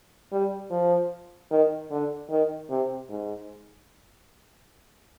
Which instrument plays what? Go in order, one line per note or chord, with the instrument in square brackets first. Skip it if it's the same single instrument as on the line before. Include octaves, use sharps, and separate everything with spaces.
[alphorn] G3
F3
D#3
D3
D#3
C3
G#2